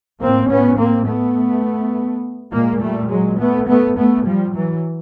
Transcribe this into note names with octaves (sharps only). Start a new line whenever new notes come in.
A2 A#3 C4
B3 C#4
A#3 C4
A3 B3
A#2 G#3 A#3
G3 A3
F#3 G#3
A3 B3
A3 B3
A3 B3
F3 G3
E3 F#3